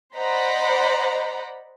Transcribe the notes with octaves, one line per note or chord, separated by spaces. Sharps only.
C5 D5 D#5 F#5 A#5 B5